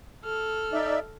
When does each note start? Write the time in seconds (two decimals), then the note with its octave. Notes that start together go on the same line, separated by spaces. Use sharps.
0.25 A4 F6
0.73 D#4 D5 E5